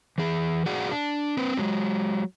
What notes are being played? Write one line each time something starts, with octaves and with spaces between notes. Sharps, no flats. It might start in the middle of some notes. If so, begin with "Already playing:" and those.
E3 G#4
F#4 G#4 D5 F#5
D4
C4 B4 C5
F#3 G#3